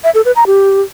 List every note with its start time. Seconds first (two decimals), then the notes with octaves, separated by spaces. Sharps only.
0.04 E5
0.15 A4
0.25 B4
0.36 A#5
0.47 G4